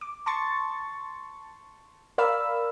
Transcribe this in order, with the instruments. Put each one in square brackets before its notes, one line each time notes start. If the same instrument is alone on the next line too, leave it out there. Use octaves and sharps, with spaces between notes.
[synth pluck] D6
A5 C6 C#6 A6
A#4 D5 F5 B5 E6